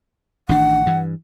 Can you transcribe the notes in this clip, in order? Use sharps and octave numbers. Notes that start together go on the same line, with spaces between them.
A1 D#3 D4 F#5
G2 E3